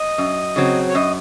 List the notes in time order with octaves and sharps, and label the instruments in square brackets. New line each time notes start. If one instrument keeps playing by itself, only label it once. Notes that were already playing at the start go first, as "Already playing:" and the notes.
Already playing: [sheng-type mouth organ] D#5
[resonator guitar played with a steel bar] F#2
C#3 F#3 C4
[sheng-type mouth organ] C#5
[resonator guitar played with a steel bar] F#2 [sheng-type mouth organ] D#5